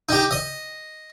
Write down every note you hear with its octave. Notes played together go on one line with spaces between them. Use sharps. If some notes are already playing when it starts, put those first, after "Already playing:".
D#4 G4
D#5